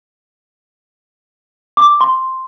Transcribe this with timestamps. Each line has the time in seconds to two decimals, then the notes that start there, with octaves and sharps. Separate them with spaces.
1.77 D6
2.01 C6